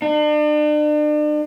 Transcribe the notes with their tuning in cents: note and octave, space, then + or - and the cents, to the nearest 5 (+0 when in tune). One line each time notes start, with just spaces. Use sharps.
D4 +40